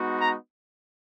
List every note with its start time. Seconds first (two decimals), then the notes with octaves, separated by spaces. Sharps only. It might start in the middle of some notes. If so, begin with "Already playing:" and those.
Already playing: G#3 B3 D#4 F#4
0.20 A#5